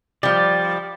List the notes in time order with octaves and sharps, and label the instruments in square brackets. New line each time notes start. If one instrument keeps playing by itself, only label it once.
[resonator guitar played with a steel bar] F3 G3 [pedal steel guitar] D5